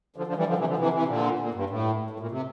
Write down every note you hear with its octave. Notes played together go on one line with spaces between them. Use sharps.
D3 F3
D3 F3
E3 G3
D3 F3
C3 E3
D3 F3
C3 E3
C3 E3
A#2 D3
A#2
G2
A2
A2
A#2
C3